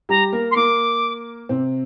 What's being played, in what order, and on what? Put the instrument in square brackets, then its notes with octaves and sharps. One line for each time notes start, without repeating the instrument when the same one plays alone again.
[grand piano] G3 G4 [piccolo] A#5
[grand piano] A#3 A#4
[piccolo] C6
[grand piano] A#3 A#4 [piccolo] D6
[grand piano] C3 C4